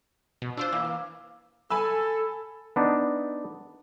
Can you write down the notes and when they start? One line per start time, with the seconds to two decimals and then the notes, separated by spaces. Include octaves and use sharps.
0.42 B2
0.57 D4 F4 C5 E6
0.73 E3 A#3
0.85 F5
1.70 A4 G#5 B5 E6
2.76 B3 D4 D#4